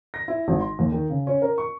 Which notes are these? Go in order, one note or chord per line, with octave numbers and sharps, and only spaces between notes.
A#6
E4
G#1
C6
D#2
D#3
C#3
C#4
A#4
C#6